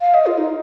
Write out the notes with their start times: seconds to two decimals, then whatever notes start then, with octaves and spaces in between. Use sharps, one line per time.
0.01 F5
0.14 D#5
0.26 F4
0.38 D#4